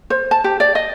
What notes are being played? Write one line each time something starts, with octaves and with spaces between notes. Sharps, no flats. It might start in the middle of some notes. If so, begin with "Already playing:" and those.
C5
A5
G4
D5
D#5